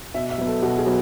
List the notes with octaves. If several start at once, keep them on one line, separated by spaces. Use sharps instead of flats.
B2 E5
E5
F#3 B3
A4
B2 F#4
G#4
F#3 B3